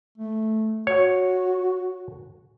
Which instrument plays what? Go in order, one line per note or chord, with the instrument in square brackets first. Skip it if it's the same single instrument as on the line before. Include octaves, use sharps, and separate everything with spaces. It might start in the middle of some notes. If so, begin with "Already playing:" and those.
[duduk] A3
[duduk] F#4 [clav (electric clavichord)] C#5